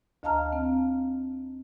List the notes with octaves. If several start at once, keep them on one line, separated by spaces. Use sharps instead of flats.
D2 D#5 F5 A5 A#5 F6
C4